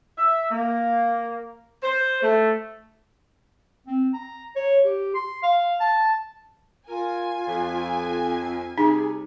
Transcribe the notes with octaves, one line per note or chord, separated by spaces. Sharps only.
E5
A#3
C5
A3
C4
A#5
C#5
G4
C6
F5
A5
F4 A#4 G#5
F2
C3 G3 D#4 G#4